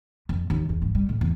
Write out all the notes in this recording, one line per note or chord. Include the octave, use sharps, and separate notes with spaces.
F2
D#2
E2
G2
G3
A2
E2